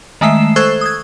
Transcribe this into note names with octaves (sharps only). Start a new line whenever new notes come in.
D#3 G#3 A3 E5 C7 E7
A4 C5 C#6 E6 F#6 G#6
D#6 G#6